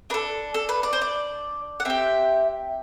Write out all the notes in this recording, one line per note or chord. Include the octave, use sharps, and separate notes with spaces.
D4 A4 B4
A4
B4
D5
C5
D5
F#5
C4 G4 E5